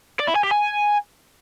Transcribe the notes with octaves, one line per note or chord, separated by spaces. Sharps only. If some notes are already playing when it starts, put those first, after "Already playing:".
D5
E4
G#5
G4
G#5